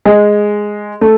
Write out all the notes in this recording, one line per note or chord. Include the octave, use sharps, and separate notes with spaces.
G#3
A3